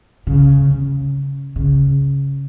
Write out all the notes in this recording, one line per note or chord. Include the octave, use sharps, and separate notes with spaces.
C#3
C#3
C#3